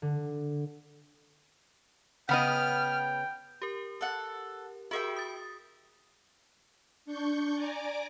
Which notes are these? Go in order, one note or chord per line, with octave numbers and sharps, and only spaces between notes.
D3
C#3 B3 D#5 F#5 G5 B5 F6
G4 A#4
A4 F#5
E4 F#4 G#4 A#4 E5 G5
D#6 A6
D4 C#6 G6
D5 G#5 A#5 D6